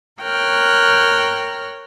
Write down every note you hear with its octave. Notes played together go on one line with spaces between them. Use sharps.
A#4 C#5 G5 F6 F#6